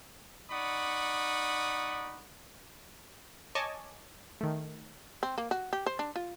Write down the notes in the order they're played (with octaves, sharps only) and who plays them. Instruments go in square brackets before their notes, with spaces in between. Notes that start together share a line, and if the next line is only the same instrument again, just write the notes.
[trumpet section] D#4 D5 F#5 B5 C#6 D#6
[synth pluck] C#5 D#5 G#5 A5 C#6 D6
D#3 A3
[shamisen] C4
A#3
F#4
G4
C5
D4
F4